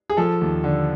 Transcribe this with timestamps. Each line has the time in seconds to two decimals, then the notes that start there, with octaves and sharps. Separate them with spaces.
0.10 G#4
0.17 F3 A4
0.41 D#2
0.64 D3